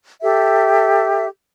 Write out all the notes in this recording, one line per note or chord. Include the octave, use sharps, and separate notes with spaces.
G4 A4 E5